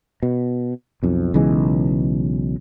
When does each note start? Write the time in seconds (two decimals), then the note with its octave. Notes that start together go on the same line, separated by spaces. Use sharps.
0.23 B2
1.03 B1 F2
1.34 B1 C#3 E3 G#3